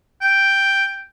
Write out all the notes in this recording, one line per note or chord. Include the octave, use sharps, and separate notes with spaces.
G5